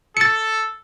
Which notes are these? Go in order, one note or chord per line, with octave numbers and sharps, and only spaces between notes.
A4 A6 C#7